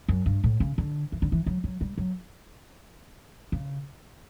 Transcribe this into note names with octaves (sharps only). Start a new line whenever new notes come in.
F#2
G2
A2
C#3
D3
E3
D3
E3
F#3
F#3
G3
F#3
C#3